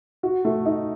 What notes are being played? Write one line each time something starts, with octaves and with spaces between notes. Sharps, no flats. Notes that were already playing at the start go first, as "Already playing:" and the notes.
F#4
A3
D#4